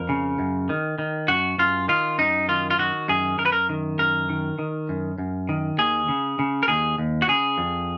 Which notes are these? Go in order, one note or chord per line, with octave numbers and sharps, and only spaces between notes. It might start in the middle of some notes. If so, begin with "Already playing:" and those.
Already playing: F2 A#4
C#3
F#2
D#3
D#3
F#2 F#4
F#2 F4
D#3 F4
F#2 D#4
D#3 F4
F4
D#3 F#4
F#2 G#4
F#2 A#4
B4
A#4
D#3
F#2 A#4
D#3
D#3
F#2
F#2
D#3
D#2 G#4
C#3
C#3
A#4
D#2 G#4
D#2
F#4
C#3 G#4
F2